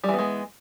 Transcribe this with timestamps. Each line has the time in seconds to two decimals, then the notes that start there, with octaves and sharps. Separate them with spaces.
0.04 G3
0.09 E3
0.14 B3
0.19 G#3